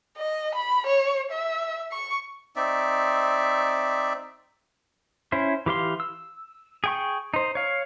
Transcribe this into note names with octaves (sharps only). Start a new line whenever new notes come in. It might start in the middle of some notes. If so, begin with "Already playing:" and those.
D#5
B5
C#5
E5
C#6
C4 D#4 D5 E5
C#4 E4 C5
E3 G4 F5 C6
E6
G#4 G5 C#6
D#4 C5
C#5 F5